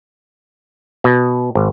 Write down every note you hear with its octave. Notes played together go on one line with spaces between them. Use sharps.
B2
G#1